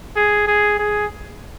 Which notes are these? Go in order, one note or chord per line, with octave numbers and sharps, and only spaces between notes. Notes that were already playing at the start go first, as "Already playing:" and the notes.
G#4
G#4
G#4